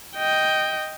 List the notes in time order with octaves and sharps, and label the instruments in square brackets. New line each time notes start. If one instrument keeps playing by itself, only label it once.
[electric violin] D#5 G5